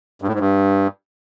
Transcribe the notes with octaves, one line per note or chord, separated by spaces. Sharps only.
G2
A2
G#2
G2